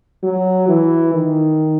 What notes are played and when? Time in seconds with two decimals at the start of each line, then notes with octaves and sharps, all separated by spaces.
0.23 F#3
0.68 E3
1.14 D#3